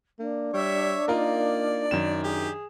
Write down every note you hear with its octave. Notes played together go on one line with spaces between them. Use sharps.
A#3 D4
G3 C#5 E5
A#3 D#4 F4 A#4 D5
F#2 D#3 E7
G4 G#4